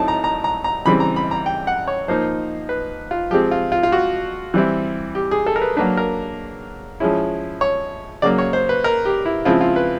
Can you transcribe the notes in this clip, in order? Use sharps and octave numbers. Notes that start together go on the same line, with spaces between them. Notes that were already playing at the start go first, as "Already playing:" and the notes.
Already playing: A2 F#3 A3 C4 D#4 A5
A#5
A#5
A#5
A#5
C#3 E3 G3 C4 B5
A#5
B5
A#5
G5
F#5
C#5
F3 A#3 D#4 C5
B4
F4
F3 G#3 C4 G4
F4
F4
F4
F#4
E3 G3 C4 E4
G4
G#4
A4
A#4
B4
F#3 A#3 D4 B4
A#4
F3 G#3 C#4 E4
C#5
C#3 F#3 A#3 D5
C#5
C5
B4
A#4
G4
E4
C#3 F3 G#3 C4 E4 F4
F4
B4